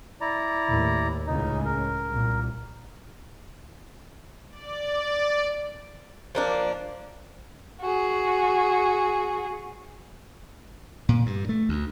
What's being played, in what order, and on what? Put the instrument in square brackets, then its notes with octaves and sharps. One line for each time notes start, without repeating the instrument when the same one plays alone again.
[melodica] E4 D5 A#5
[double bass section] D#2 A2
[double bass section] C#2 A2 C#3 [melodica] D#4
[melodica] A#4
[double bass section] C2 A#2
[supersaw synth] D5
[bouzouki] F3 A#3 D4
[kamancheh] F#4 G#4
[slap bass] A#2
G2
A3
D2